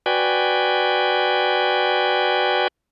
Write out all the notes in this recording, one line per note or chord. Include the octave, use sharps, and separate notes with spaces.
F#4 B4 D5 G5 G#5